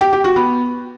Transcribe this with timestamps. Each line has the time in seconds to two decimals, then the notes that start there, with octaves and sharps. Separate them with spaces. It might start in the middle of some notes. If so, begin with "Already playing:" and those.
0.01 G4
0.13 G4
0.24 F#4
0.36 B3